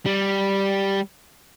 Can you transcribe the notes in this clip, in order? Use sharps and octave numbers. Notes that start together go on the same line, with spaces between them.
G3